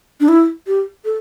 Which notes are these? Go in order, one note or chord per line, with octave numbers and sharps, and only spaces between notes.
D4
E4
G4
A4